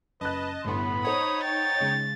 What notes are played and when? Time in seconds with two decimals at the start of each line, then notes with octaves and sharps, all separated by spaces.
0.21 F#1 B4 D#5 A5 F#6
0.64 G1 A2 B3 B5 C6
1.04 D#4 C5 C#5 F#5 D#6
1.44 G5 A6
1.80 C#3 G#3